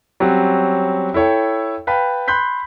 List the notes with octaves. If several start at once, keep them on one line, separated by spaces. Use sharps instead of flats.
F#3 G3 C4 C#4 F#4
E4 A4 C#5 G5
B4 F5 G5 A5 B5
B5 C6 F#6 G6 B6